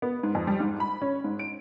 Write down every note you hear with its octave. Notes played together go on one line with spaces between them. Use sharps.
B3
G#2
F2
G3
G#2
B5
C#4
G#2
D7